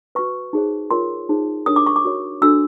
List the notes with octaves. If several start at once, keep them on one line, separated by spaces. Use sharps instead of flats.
F#4 B4 C#6
D#4 G#4 C5
F4 A#4 C#5 C6
D#4 G#4 C5
D4 G4 A#4 C#5 D#6
D6
C#6
D6
F#4 A#4 C#5
D4 F#4 A4 E6